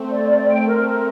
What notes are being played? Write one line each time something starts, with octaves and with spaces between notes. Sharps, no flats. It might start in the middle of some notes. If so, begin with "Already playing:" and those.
Already playing: A3 C4
D5
D5
G5
A#4
A#4